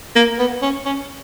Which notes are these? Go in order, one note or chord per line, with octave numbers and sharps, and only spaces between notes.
A#3
B3
C#4
C#4